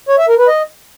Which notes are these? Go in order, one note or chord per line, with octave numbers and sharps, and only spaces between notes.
C#5
E5
A#4
B4
D#5